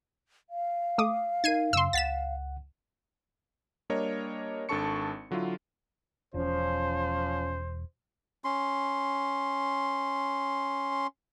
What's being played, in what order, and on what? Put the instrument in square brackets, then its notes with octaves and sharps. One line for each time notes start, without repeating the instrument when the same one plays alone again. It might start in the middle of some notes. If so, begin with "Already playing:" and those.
[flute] F5
[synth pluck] A3 D6 D#6
[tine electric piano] D#4 A#4 [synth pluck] G#6 C7 D#7
[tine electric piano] F#2 C#3 [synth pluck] C6 E6
[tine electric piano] C#2 F#5 [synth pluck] A6 B6 E7
[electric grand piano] G3 A#3 D4 A#4 C#5 D#5
G#1 D4 A4 A5 C#6 C#7
D3 F#3 E4 F4
[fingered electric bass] E1 [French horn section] F3 C#4 [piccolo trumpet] C5
[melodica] C#4 C6